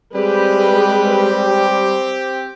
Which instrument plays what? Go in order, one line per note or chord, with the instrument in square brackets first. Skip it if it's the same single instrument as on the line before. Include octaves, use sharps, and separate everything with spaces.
[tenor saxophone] G3 [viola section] G#3 B4 [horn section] C4 G4